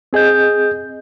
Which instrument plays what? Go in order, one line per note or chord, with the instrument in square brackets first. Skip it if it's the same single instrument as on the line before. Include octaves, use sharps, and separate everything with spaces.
[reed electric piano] C4 G#4 D#5 G6